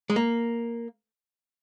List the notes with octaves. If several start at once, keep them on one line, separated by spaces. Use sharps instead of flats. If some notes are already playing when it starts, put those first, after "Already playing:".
G#3
A#3